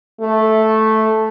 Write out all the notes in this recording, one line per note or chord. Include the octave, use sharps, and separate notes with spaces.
A3